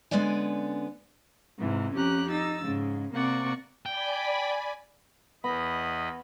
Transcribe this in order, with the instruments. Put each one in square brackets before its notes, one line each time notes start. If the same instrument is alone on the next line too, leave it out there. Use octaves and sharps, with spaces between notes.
[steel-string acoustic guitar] D3 G#3 B3 C#4 D5 G#5
[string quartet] G#2 C3 E3
F2 C#4 G4 A#5 F#6
D#4 E6 A6
G#2 C#3
C3 A#3 C4 D5 F#5 C#6
[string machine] D5 G#5 B5 [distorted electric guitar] G5
[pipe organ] E2 D#5 B5 [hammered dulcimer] B3